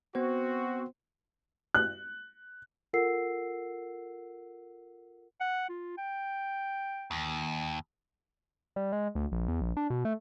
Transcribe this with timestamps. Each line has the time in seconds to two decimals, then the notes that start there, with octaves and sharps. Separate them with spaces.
0.15 B3 C4 F#4 C5
1.75 F#6
2.93 F4 A4 A#4 F#5 E6 C7
5.40 F#5
5.69 F4
5.98 G5
7.11 D#2
8.76 G3
8.93 G#3
9.15 D2
9.32 A#1
9.48 E2
9.61 A#1
9.77 D4
9.90 B2
10.05 A3